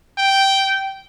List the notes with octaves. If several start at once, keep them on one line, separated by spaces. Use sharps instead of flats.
G5